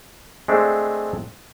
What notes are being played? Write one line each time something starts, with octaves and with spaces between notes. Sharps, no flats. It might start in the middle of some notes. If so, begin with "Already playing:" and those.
G#3 A3 C4 D4